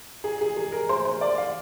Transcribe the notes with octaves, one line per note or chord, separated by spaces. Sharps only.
G#4
G#4
G#4
A#4
C5
C5
D5
F5